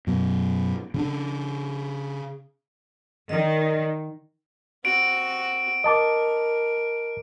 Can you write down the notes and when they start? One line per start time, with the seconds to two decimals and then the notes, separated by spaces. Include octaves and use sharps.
0.07 F#2 B2
0.94 C#3 C#4 D4
3.29 D#3 D5 D#5
4.85 C4 F#4 D7
5.84 A#4 D#5 A5 D6